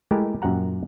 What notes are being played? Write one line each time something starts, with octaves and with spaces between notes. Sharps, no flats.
G#3 A3 E4 G4 A#4
F#2 A#2 G4 F#5 A#5